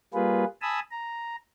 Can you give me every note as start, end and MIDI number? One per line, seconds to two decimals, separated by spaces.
0.14 0.45 55
0.14 0.45 58
0.14 0.45 65
0.14 0.45 68
0.14 0.45 71
0.62 0.80 80
0.62 0.80 81
0.62 0.80 83
0.62 0.80 87
0.62 0.80 88
0.91 1.36 82